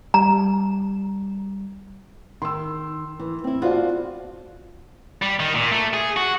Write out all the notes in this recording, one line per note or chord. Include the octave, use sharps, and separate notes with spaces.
G3 A#5
D#3 C6 E6
E3
C4 E4
F4 F#4 C5 D5 F5 A5
G3
D#3
A#2
A3
G#4
F#4